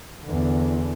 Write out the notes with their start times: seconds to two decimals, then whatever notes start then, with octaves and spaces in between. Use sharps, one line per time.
0.23 E2 D3